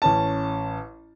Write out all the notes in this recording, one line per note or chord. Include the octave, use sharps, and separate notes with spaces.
A1 C#4 A5